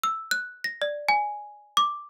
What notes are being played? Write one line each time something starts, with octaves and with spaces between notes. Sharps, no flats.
E6
F#6
A#6
D5
G#5
D6